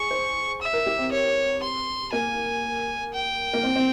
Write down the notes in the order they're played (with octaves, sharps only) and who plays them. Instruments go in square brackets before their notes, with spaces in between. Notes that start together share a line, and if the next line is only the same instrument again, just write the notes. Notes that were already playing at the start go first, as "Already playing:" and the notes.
Already playing: [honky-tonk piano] G#4 [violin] C#6
[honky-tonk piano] C5
[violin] E5
[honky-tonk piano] A#4
G4
C4
[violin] C#5
C6
[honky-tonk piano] A#3 [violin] G#5
[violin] G5
[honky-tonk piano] A#3
C4
C4